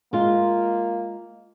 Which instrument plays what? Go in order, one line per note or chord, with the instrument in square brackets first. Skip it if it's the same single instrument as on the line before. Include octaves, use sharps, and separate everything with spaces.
[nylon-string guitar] G#3 F4 [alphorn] A#3